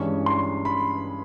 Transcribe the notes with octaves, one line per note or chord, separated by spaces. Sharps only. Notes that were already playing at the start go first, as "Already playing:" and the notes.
Already playing: G2 E3 G#3 C#4 C#6
C6
B5